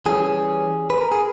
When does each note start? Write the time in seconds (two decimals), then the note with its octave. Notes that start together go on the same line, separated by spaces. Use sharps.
0.06 E3 G3 C#4 G#4
0.90 B4
1.01 A#4
1.12 G#4